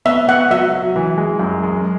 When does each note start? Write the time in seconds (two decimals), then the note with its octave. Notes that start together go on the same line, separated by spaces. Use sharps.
0.05 B3 E5
0.28 B3 F#5
0.50 F#3 E5
0.73 F#3
0.96 E3
1.17 G#3
1.39 F#2
1.63 G#3